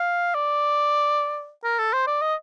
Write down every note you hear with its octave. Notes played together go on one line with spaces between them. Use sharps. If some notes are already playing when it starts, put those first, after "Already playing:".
Already playing: F5
D5
A#4
A4
C5
D5
D#5